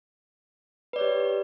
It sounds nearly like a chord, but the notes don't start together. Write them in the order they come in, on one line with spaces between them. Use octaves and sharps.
B4 D5 C#5 G4